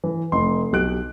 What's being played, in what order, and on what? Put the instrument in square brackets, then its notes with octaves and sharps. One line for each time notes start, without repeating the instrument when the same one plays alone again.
[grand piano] E3
F1 C6
B1 G4 F#6 D7